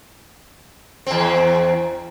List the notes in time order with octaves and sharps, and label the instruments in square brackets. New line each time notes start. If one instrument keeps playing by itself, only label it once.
[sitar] E2 C4